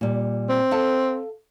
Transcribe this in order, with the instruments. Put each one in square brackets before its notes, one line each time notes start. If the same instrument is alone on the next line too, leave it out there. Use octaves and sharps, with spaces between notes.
[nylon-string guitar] A#2 G3
[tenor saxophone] C4
[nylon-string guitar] A4 F5 A5